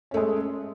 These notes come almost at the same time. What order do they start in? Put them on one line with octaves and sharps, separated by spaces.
C#4 A3 G#3